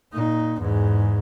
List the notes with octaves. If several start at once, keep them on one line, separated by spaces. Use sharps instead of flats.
A#2 D#4
E2 G#2